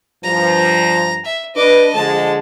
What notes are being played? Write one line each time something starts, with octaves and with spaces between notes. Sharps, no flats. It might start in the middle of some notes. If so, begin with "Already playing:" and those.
G2 F3 A#5
E5
D4 B4 D#5 D6
D3 F3 G#3 A5